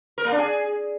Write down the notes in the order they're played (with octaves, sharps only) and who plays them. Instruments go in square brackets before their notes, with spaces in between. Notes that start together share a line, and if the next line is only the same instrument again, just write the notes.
[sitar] A#4
A#3
D4
G#4